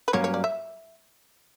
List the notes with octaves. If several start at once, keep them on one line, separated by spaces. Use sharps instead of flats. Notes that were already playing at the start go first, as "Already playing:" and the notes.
B4
G2 F#3 A#3 C#4 C#5
C#5
D5
E5